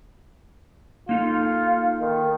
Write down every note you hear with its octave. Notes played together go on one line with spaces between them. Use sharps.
A#3 D#4 F4 A4
D#3